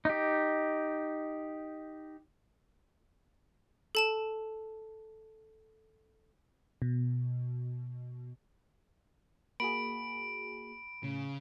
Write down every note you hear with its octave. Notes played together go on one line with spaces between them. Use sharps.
D#4 G4
A4 A5 E7
B2
A#3 F#4 G#4 B5 D7
A2 C#3